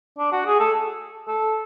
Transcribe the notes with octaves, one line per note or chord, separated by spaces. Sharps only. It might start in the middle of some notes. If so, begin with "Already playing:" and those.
D4
F#4
G#4
A4
A4